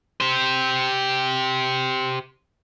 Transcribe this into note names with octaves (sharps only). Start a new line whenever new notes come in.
G4 C5